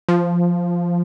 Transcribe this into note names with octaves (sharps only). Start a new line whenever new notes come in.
F3